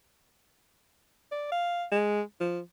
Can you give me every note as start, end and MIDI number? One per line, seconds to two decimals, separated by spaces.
1.32 1.51 74
1.52 1.86 77
1.92 2.21 56
2.40 2.60 53